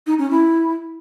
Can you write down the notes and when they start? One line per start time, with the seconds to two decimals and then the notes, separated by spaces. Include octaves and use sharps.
0.07 D#4
0.19 C#4
0.31 E4